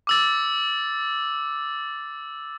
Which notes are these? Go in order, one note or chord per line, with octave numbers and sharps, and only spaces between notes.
D6 E6 A6